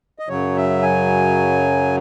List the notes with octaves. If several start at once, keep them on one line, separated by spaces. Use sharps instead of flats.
D#5
F#2 C#3 F#3 C#5
E5
G#5